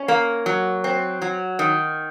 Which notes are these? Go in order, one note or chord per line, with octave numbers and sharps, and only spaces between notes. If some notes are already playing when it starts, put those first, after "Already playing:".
Already playing: C#4
A#3
F#3
C4
F#3
D#3